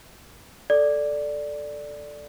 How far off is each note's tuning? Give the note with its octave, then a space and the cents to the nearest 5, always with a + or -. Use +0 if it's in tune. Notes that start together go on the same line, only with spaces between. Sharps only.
A4 +0 D5 +0